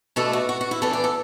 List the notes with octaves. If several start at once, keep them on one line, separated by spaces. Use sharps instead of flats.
B2 A3 D4 A4
F#4
F#4
F#4
E4
E3 B3 D4 A4
D5
A4